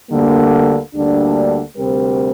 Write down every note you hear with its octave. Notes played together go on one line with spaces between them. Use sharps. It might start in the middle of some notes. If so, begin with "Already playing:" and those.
D2 D3 G3 A#3
D2 D3 G3 A#3 D4
D2 C3 G3 C4 A#4